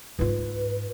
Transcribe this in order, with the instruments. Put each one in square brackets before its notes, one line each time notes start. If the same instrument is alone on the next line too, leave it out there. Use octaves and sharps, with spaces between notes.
[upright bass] G#2 F4 [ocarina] B4